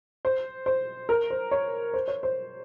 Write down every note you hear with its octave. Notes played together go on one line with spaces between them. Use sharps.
C5
C5
A#4
C5
C#5
C5
C#5
C5